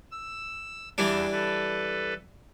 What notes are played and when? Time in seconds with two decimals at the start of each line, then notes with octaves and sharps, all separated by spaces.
0.12 E6
0.98 E2 E3 G3 D4
1.32 A4 B4